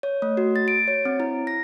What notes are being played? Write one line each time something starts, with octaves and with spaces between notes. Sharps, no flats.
C#5
A3
F#4
A6
D7
C#5
C4
E4
A#6